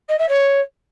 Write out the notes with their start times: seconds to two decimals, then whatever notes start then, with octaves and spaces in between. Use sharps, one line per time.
0.09 D#5
0.19 E5
0.28 C#5